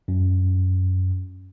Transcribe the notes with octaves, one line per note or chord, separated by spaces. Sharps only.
F#2